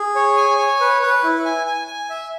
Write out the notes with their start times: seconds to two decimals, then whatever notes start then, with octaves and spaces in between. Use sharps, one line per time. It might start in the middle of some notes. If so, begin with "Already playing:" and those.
Already playing: G#4
0.15 C#5
0.37 G#5
0.58 C#5
0.81 B4
1.02 B4
1.24 E4
1.45 G#5
1.67 G#5
1.87 G#5
2.10 E5